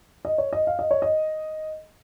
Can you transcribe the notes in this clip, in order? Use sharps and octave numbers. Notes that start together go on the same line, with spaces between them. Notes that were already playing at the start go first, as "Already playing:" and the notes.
D#5
C#5
D#5
F5
D#5
C#5
D#5